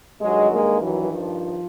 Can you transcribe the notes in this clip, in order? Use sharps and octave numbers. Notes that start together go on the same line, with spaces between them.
G2 D#3 F#3 G#3
G#3 A#3
E3 F#3
F3